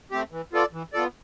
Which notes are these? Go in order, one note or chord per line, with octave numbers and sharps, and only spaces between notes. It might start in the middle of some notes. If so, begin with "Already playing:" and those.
A3 C4 G4
E3
B3 F4 A4 D5
E3
B3 F4 A4 D5